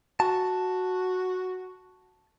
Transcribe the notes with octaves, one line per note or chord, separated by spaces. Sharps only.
F#4 A5